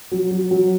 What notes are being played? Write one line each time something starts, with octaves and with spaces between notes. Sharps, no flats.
F#3
F#3
F#3